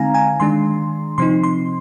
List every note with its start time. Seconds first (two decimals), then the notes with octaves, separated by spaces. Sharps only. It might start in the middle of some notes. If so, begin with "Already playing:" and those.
Already playing: D3 G#3 C4 D#4 F5 G#5 A#5
0.14 G#5
0.40 D#3 G#3 D4 C6
1.18 C3 F3 C4 D#4 C6
1.43 C6